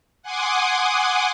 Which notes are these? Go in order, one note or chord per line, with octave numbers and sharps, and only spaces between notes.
F#5 G#5 C6 D6 D#6